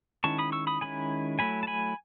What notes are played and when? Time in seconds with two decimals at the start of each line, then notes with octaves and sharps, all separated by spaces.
0.24 D#3 G#3 C#4 E4 A5 C#6
0.39 B5 D#6
0.52 C#6 E6
0.67 B5 D#6
0.81 D#3 G#3 C#4 E4 G#5 B5
1.39 F#3 A3 E4 G#5 B5
1.63 A5
1.67 G#5 B5